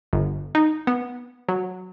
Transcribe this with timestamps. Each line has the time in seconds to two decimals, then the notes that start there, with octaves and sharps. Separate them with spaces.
0.13 G1
0.55 D#4
0.87 B3
1.49 F#3